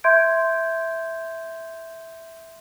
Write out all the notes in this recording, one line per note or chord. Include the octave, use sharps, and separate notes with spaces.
E5 C6 G6 G#6 D7